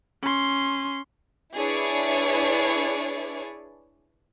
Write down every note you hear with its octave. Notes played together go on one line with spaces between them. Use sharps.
C#4 C6
D4 E4 G#4 B4 C#5 D5